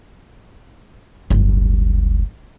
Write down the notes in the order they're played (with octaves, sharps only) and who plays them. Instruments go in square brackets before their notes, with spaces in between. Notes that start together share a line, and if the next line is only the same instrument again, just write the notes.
[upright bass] D1 G1